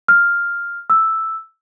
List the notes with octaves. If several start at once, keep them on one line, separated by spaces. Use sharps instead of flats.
F6
E6